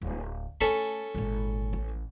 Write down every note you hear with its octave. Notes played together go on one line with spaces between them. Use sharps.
D1
A3 C#4 A4 B5
G#1 A#2
A1